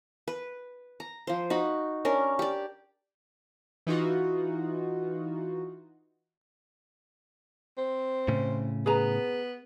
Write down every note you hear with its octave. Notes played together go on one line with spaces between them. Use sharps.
B4
A#5
F3 C5
D#4 F#4 B5
C#4 D4 A#4
G4 D5
E3 D#4 F4 F#4
C4
A2 C#3
B3 G#4 B4 A#5